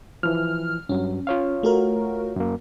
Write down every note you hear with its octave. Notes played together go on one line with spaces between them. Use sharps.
E3 F3 F6
G2 F#3 C#4
F4 C#5 F5
A3 F#4 A#4
F#2 A#3